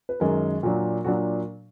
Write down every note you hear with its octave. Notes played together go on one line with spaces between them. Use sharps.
B4
F#2 D#3 G#3 A#4
A#2 F#3 D4
A#2 F#3 D4 F#4